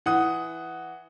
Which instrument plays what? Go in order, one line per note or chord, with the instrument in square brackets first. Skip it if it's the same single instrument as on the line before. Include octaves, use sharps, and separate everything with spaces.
[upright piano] E3 F#5 D#6